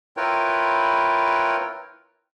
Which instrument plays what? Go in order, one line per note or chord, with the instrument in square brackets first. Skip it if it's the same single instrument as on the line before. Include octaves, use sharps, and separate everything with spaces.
[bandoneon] E4 F4 A#4 B4 C#5 G5